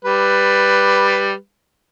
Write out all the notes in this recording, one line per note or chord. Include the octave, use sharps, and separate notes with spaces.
G3 B4